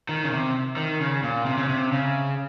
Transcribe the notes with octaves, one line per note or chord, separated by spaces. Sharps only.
D#3
C#3
C3
D#3
C#3
A#2
C3
C#3
C3
C#3